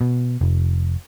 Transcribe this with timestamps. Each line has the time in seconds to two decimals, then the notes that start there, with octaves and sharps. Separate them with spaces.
0.01 B2
0.41 F1